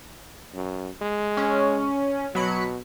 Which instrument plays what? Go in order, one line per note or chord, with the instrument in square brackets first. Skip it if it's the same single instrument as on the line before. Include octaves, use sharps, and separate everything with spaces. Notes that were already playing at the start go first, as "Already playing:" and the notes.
[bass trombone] F#2
G#3
[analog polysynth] C#4
[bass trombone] B2 [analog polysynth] F#3 B5 C#7